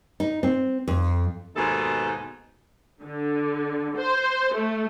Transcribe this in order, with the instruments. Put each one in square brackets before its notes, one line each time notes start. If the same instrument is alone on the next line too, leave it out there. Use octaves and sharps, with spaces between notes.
[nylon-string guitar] D#4
C4
F2
[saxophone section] D#2 G#2 B2 D#4 A4
[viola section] D3
C5
A3